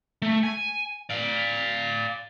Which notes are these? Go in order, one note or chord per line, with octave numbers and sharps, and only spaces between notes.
A3
G#5
D5 F5